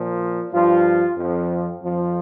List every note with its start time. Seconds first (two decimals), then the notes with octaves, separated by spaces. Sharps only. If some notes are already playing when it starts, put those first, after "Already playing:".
Already playing: A#2 F3
0.53 G2 F3 F4
1.17 F2 F3
1.81 F2 F3